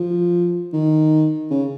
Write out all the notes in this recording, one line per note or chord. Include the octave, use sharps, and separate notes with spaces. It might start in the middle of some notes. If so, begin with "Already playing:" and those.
Already playing: F3
D#3
C#3